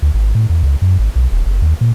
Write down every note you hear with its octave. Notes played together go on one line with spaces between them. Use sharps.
D2
G#1
A2
E2
C#2
F#2
G#1
B1
D#1
F#1
D#2
A#2